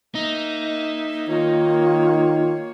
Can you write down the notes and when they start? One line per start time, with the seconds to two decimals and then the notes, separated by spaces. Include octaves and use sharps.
0.15 A#3 D#4 E5
1.28 D#3 A#3 F4 C#5